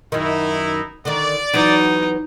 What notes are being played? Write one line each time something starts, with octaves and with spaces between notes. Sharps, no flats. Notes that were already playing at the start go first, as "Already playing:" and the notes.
F#2 D#3 D#4 E4
D3 D#3 D5
E2 E3 F#3 D#4